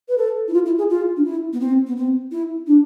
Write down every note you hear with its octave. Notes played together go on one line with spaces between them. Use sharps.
B4
A4
E4
F4
E4
G#4
F4
D4
E4
B3
C4
B3
C4
E4
D4